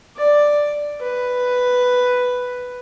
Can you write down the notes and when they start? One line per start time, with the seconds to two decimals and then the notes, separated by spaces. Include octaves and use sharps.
0.17 D5
1.01 B4